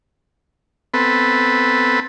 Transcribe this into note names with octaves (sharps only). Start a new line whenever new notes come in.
B3 C4 A4 B4